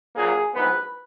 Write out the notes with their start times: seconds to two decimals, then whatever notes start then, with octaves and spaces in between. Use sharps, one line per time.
0.16 A#1 A#2 F#3 A#3 G#4
0.54 A#1 G#2 F#3 B3 B4